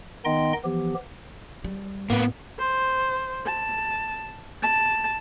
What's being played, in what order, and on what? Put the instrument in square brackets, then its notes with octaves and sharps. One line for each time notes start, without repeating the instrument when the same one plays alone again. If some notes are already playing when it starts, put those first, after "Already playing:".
[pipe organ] D#3 B3 D#4 D#5 G5 C6
E3 F3 B3 G4
[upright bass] G3
[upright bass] A2 [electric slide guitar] A#3 B3
[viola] C5
A5
A5